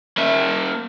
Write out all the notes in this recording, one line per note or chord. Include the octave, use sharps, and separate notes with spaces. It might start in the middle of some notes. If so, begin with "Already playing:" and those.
A#3 E5